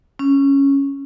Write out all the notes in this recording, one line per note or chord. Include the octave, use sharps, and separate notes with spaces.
C#4